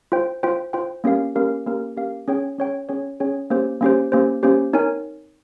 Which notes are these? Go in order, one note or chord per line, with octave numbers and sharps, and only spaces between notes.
F4 C5 G5
F4 C5 G5
F4 C5 G5
A#3 C#4 G4 A#4 F5
A#3 C#4 G4 A#4 F5
A#3 C#4 G4 A#4 F5
A#3 C#4 G4 A#4 F5
C#4 G#4 C#5 G5
C#4 G#4 C#5 G5
C#4 G#4 C#5 G5
C#4 G#4 C#5 G5
A#3 C#4 G4 C5
A#3 C#4 G4 C5
A#3 C#4 G4 C5
A#3 C#4 G4 C5
C4 D#4 A#4 C#5 G#5